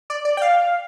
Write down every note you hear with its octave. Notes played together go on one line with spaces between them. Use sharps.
D5
D5
G5
F5